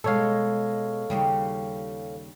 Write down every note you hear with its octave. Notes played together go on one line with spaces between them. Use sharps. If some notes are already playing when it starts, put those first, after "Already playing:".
B2 G#3 A4 C#5 F5
D#2 C#3 G3